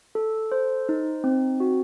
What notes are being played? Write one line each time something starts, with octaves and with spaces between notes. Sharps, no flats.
A4
C5
D#4
C4
F#4